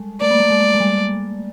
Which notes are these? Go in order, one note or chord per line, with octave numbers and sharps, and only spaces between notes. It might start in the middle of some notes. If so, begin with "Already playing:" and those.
Already playing: G3 G#3
A3 D5
A#3
A3
G#3
G#3
G3